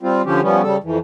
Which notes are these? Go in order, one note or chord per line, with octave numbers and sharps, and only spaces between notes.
G3 C4 F4
D3 F3 C#4 G4
F3 G3 B3 C#4
C#3 G3 A4
F2 E3